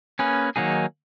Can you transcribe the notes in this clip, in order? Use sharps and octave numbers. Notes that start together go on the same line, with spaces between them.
A#3 C#4 G#4 B4
D#3 F#3 A#3 D#4 G#4